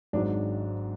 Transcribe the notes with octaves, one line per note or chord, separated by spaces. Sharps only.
G#1 G#2 F#3 D4